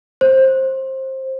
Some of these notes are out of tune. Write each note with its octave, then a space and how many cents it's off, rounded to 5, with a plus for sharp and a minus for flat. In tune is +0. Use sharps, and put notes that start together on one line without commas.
C5 +20